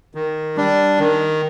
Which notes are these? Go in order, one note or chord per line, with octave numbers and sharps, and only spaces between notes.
D#3
G3 D4
D#3